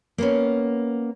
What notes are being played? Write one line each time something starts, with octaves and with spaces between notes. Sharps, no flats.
A#3 B3 C#4